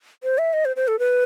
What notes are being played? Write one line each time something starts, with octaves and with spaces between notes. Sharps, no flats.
C5
E5
D#5
C5
C5
A4
B4